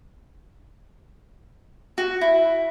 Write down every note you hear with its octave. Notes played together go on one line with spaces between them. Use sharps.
F#4
E4